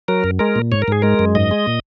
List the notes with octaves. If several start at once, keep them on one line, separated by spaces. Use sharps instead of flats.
F#3 A#4
F#2
G#3 A#4
A#2
G#2 C#5
A#4
G#2 G#4
G#3 A#4
F#2
G#2 D#5
G#3
A#2